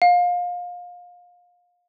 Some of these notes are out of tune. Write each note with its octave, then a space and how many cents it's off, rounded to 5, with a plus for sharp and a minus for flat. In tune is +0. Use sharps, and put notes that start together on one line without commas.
F5 +25